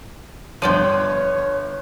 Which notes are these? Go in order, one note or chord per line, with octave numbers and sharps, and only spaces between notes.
G1 F3 C#5 D5 G5 C6 D#7